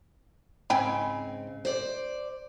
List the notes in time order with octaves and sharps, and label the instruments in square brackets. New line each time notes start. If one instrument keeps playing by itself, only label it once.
[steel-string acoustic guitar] G#2 C#3 C4 [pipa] G5 G#5 B5
[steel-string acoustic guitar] C5 D5